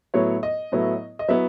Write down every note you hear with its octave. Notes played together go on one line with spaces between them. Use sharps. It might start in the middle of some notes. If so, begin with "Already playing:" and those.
A2 F#3 B3 E4 C#5
D#5
A2 F#3 B3 E4
D#5
F#3 B3 E4 E5